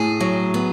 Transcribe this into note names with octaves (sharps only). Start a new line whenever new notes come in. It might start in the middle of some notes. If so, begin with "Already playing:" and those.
Already playing: A2 G#4
F#3
B3